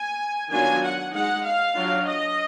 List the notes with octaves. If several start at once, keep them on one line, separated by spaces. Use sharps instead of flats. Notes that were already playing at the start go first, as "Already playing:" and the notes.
Already playing: G#5
D#3 F#3 B3 D4 F4 G#5
F#5
G#3 D#4 F#5
F5
F#3 D4 F4
D#5